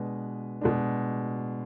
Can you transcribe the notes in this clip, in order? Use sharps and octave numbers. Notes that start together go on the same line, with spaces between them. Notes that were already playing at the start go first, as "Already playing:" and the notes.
Already playing: B2 G#3 D4 B4
B2 G#3 D4